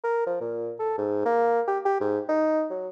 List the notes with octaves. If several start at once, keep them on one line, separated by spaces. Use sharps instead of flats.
A#4
F3
A#2
A4
G#2
A#3
G4
G4
G#2
D#4
F#3